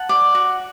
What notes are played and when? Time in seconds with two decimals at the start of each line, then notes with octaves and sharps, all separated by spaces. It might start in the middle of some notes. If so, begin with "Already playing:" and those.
Already playing: F#5 A5
0.09 D5
0.35 F#4